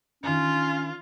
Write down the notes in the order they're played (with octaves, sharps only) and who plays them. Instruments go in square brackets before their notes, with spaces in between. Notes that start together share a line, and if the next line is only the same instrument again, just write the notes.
[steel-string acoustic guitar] D#3 D4 [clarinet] C#4 [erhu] F4